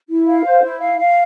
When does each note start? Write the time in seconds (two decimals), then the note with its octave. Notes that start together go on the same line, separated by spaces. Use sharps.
0.09 E4
0.26 F5
0.45 C5
0.63 E4
0.80 F5
0.98 F5